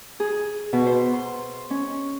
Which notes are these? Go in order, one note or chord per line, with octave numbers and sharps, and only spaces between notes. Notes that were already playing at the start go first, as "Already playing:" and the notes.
G#4
B2
C5
C6
C#4